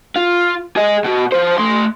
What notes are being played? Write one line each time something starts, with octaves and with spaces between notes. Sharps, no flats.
F4
G#4 D#5
B2 F#4
F3 C5
A3 C6